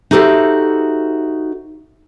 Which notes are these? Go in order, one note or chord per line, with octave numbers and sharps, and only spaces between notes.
D#4 F#4 G4 A4 C5 E5